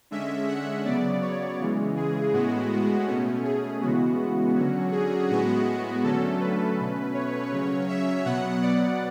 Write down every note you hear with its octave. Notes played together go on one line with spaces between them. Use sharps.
D3 G#3 C#4 E5
F#5
C#3 F#3 B3 D5
C#5
C#3 E3 G#3
G#4
A2 G#3 B3 F#4
B2 A3 C#4
G#4
C#3 E3 G#3 B3 F#4
F#4
D3 F#3 C#4 F#4
G#4
A2 G#3 B3 F#4
D3 F#3 A3 C#4 A4
B4
B2 A3 C#4
C#5
C#3 F#3 C#4
E5
B2 F#3 B3 F#5
D5